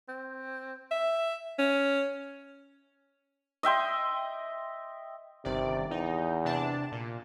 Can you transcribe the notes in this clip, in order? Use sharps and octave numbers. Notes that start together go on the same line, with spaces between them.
C4
E5
C#4
D#5 E5 G5 C6
G1 C3 D#3 D5
E2 D#4
C3 D4 A5
A#2